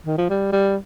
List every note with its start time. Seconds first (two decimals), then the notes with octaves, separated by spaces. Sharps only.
0.06 D#3
0.18 F3
0.30 G3
0.53 G3